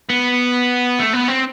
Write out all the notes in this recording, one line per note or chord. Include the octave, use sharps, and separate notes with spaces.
B3
A3
B3
C4